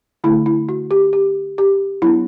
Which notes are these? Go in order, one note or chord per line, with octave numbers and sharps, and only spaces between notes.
D3 A3 D4 E4
E4
F#4
G4
G4
G4
F#3 B3 D4 E4